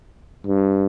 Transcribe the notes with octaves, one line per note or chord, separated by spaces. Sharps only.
G2